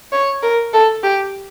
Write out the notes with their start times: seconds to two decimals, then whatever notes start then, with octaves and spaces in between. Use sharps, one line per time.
0.12 C#5
0.43 A#4
0.73 A4
1.03 G4